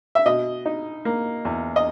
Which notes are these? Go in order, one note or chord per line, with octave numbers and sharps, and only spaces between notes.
E5
B2 D#5
D#4
A#3
E2
D#5